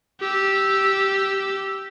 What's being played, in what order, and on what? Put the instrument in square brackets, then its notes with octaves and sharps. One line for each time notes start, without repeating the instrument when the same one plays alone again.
[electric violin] G4 E6